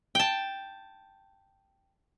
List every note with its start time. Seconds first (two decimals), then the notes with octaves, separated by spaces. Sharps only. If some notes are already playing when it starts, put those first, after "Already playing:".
0.15 G5 A5